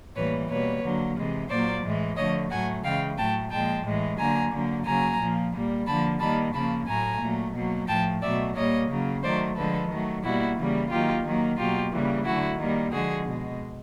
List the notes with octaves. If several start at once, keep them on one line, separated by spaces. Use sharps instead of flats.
A2 E3 G3 A#3 B4 C#5
B2 G3 A#3 B4 C#5
D3 F#3 A#3
C3 E3 G#3
A#2 F#3 A#3 C5 D5
A2 E3 G#3
D3 F3 A3 C#5 D#5
A2 F#3 A3 F#5 G#5
C#3 E3 G#3 F5 G5
A2 F#3 A3 G5 A5
A#2 F3 G#3 G5 A5
A2 E3 G#3
D3 F#3 A#3 G#5 A#5
D3 F#3 A#3
C#3 F#3 A#3 G#5 A#5
A#2 F3 A#3
A#2 G3 A#3
D3 F3 A#3 A5 B5
D#3 G3 A#3 A5 B5
C#3 F3 A#3 A5 B5
A2 F#3 A3 G#5 A#5
A#2 F#3 A3
B2 F#3 A#3
A2 F3 A3 G5 A5
B2 F#3 A3 D5 E5
A#2 G3 A#3 C#5 D#5
C#3 F#3 A#3
D#3 F#3 A3 C5 D5
D3 F3 G#3 A4 B4
D#3 F#3 A3
B2 G3 A#3 E4 F#4
C#3 E3 G3 A#3
D#3 F#3 A#3 F4 G4
D#3 F#3 A#3
B2 F#3 A#3 F4 G4
C#3 E3 G3 A#3
D3 F#3 A3 E4 F#4
D#3 G3 A#3
D3 F3 G#3 F#4 G#4
B2 G#3